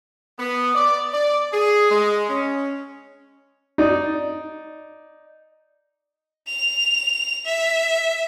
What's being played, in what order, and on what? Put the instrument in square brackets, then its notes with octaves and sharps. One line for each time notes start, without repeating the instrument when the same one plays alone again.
[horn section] B3
D5
D5
G#4
G#3
C#4
[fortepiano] D#4 D5
[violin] F7
E5